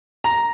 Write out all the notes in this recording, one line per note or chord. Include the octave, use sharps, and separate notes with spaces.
A#5